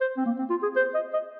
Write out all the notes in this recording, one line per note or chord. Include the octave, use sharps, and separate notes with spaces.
C5
C4
A#3
C4
F4
G#4
C5
D#5
D#5